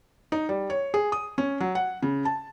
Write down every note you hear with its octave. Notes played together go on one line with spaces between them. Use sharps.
D#4
G3
C#5
G#4
D#6
C#4
F#3
F#5
C#3
A5